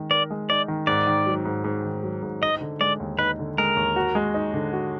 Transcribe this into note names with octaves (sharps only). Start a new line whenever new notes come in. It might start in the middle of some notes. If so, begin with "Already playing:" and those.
Already playing: D#3 G#3 D#4
A#4 D5
G#3
D#4 D5
D#3
G#2 D5
D#3
F#3
G#2
G#2
D#3
F#3
G#2
D#4 D#5
D3
G#3 D5
D#2
D#4 B4
D3
G#3 A#4
D#2
F#4
G#3
D#4
D3
F#4